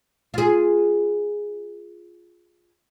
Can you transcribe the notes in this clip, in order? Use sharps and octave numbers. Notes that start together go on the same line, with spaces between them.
F4 G#4